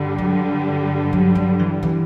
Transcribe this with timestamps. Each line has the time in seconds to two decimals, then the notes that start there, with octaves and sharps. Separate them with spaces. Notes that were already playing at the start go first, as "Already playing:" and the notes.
Already playing: G2 D3 G3
0.18 F#3
1.13 F#3
1.35 F#3
1.59 E3
1.83 E3